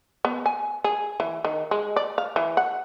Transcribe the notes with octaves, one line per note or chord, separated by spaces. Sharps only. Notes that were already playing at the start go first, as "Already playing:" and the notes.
B3
G#5
G#4
E3
D#3
G#3
D5
F5
E3
F#5